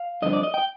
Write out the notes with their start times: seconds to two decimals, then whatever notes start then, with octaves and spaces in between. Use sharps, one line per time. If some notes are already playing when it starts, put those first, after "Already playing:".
Already playing: F5
0.22 G2 D3 F3 C4 D#5
0.33 D5
0.43 D#5
0.54 G5